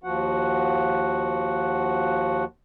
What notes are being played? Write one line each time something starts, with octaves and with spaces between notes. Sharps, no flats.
D#2 F3 F#4 F#5